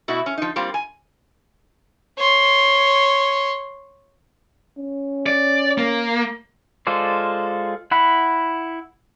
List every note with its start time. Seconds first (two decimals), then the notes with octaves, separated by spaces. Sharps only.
0.08 B2 A3 E4 F#4
0.26 C#4
0.38 F3 D#4
0.56 G3 A#3 C4 F4
0.74 G#5
2.18 C#5 C6
4.78 C#4
5.26 D5
5.78 A#3
6.87 G#3 F4 A4 C5 D5
7.91 E4 F#5 B5